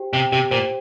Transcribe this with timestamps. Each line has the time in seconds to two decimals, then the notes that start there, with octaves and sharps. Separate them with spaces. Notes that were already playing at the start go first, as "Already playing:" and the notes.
Already playing: G4 C5 G5
0.13 C3 G5
0.32 C3 G4
0.51 A#2 C5